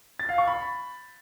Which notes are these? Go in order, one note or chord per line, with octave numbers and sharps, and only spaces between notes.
A6
F5
C#6
B5